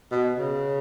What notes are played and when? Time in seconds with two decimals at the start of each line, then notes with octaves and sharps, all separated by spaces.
0.12 B2
0.39 C#3